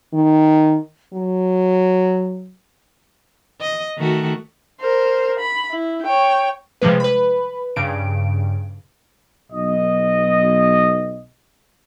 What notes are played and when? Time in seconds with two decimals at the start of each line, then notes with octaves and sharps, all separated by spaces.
0.13 D#3
1.13 F#3
3.61 D#5
3.98 D#3 A3 F#4
4.81 A#4 C5
5.40 B5
5.71 E4
6.03 C#5 G5
6.82 C3 F3 G3 G#3 B4
7.00 B4 B5
7.76 G2 C#3 D7
9.52 B1 D#5